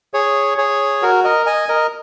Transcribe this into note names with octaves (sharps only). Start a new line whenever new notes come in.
G#4 C#5
G#4 C#5
F#4 A#4
A#4 D#5
D#5 G#5
A#4 D#5